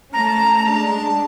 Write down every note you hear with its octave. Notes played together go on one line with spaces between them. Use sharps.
A3 C#4 A5 A#5
G#3 D4 A5